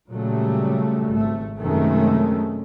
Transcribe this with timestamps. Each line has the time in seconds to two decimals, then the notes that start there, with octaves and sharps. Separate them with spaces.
0.11 A#2 C#3 F#3 G3 A3
1.09 G#1 A3
1.59 F#2 C3 D#3 G#3 A3 C#4